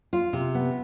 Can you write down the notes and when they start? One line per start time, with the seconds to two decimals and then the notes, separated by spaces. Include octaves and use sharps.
0.13 F4
0.33 C3
0.55 B3